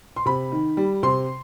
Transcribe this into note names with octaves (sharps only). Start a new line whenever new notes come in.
C6
C3 B5
D#3
G3
C3 C6